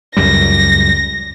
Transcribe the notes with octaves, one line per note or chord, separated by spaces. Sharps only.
C#2 F#2 G3 A#6